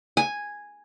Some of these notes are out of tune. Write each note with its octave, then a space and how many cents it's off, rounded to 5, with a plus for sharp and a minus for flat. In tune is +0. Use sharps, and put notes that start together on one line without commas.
G#5 -5